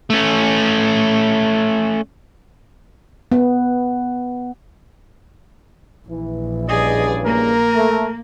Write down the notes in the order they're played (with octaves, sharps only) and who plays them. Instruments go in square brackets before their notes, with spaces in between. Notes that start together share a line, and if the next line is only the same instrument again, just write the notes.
[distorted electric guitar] A3 C#4
[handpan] B3
[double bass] A#1 [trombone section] E3
[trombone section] G2 C#3 E3 [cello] G#4 D5 [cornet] D#5
[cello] A#3 [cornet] A#4
[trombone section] A3